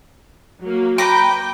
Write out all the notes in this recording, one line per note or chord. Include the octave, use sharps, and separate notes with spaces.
F#3 A#3
B4 G5 A#5 D6